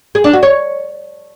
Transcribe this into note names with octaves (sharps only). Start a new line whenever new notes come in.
G#4
D4
F#4
C#5